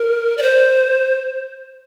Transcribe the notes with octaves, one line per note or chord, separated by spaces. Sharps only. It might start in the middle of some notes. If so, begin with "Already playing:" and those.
Already playing: A#4
D5
C5